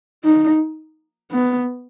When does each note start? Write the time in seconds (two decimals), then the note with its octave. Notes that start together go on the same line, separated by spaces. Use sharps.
0.24 D#4
1.32 B3